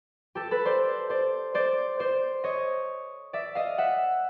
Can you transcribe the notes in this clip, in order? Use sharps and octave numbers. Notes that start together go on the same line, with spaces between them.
G4 A4
A4 B4
C5 D5
C5 D5
C5 D5
C5 D5
C#5 D#5
D5 E5
D#5 F5
E5 F#5